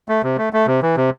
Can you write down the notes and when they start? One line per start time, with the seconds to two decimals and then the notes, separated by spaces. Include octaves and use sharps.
0.09 A3
0.23 C3
0.38 A3
0.53 A3
0.67 C3
0.82 E3
0.97 C3